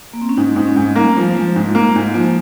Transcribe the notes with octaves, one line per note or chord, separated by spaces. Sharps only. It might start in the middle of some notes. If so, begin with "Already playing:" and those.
A#3
C4
C#4
G#2 D#4
G#2 D#4
C#4
G#2
G3 A#3
F3
G#3
F3
G#2 G#3
A#3
G#2
F3 A#3